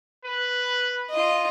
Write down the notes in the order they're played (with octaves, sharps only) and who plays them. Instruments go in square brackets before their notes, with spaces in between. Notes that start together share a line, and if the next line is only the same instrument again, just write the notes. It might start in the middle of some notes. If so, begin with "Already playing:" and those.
[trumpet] B4
[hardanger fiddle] F4 D#5